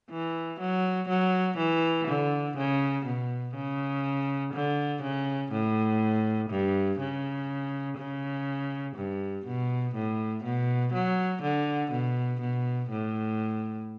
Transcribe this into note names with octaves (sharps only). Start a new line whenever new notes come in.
E3
F#3
F#3
E3
D3
C#3
B2
C#3
D3
C#3
A2
G2
C#3
C#3
G2
B2
A2
B2
F#3
D3
B2
B2
A2